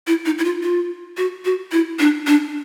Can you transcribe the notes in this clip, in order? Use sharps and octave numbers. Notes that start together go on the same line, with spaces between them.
E4
D#4
E4
F4
F4
F#4
F#4
E4
D4
D4